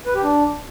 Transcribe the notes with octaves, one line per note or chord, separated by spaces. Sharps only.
B4
G4
D4